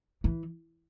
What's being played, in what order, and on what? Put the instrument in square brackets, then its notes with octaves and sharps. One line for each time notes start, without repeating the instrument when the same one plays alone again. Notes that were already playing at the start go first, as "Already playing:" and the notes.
[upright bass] E3